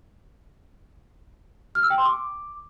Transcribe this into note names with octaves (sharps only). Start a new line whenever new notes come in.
F6
E6
G5
C6
D6